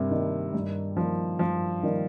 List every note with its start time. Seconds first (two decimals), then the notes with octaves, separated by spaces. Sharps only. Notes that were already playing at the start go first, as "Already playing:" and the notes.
Already playing: G2 C3 A#3
0.11 D#3 G3 A#3
0.53 G2
0.96 D#3 F3 G3 A#3
1.39 G2 F3
1.83 D#3 G3 A#3